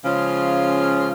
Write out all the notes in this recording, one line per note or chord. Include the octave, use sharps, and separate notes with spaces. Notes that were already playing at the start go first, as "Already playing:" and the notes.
C#3 F3 G#3 C#4 F4